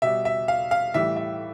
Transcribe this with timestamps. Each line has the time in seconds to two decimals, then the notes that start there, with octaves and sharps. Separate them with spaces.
0.02 B2 G3 E5
0.25 E5
0.48 F5
0.71 F5
0.94 A2 E3 G3 E5
1.16 E5